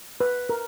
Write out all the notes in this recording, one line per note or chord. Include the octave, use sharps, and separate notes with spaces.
B4
A#4